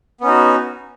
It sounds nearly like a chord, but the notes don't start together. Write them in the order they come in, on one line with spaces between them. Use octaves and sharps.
B3 C#4 D#4 F#4